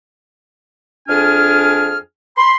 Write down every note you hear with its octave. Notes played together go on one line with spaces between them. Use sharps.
F2 D4 G#4 G#5 F6
B5 C6